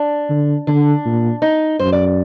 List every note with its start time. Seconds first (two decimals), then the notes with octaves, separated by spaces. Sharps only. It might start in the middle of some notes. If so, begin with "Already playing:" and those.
Already playing: D4
0.29 D3
0.67 D3 D4
1.05 A#2
1.42 D#4
1.79 F#2 C5
1.92 D5